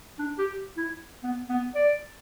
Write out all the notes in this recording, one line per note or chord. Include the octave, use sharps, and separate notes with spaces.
D4
G4
E4
B3
B3
D5